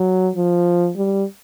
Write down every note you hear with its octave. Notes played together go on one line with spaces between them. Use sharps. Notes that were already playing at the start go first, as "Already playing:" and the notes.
Already playing: F#3
F3
G3